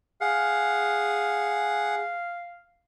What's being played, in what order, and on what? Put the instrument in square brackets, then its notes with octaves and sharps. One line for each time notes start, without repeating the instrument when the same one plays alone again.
[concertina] G#4 F#5 [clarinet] F5